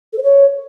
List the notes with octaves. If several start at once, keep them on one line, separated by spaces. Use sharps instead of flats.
A4
C5
C#5